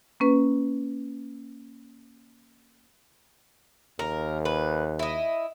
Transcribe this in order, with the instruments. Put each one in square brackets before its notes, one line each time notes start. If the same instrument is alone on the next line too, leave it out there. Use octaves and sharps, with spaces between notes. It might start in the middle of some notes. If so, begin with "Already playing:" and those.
[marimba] A#3 C#4 B4
[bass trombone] D#2 [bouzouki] A#4
[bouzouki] B4
E4 D#5